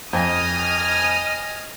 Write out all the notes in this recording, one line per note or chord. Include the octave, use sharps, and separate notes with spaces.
F2 D#5 G#5 D#6 F6